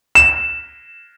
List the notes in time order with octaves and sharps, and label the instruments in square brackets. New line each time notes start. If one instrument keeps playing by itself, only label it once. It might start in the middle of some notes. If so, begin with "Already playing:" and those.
[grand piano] E7